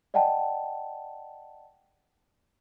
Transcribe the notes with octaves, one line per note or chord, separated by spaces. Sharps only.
D5 D#5 F#5 G5 A5